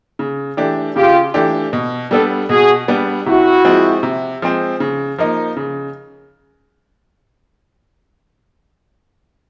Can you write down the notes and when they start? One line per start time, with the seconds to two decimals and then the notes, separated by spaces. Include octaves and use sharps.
0.19 C#3
0.57 E3 A3 D4 G4
0.96 C#3 F4 G4
1.34 E3 A3 D4 G4
1.73 B2
2.11 G3 B3 D4 G4 A4
2.49 B2 F#4 G#4
2.88 G3 B3 D4
3.26 C3 E4 F#4
3.65 F3 G#3 C4
4.03 C3
4.42 F3 G#3 C4
4.80 C#3
5.18 F3 A#3 D#4
5.57 C#3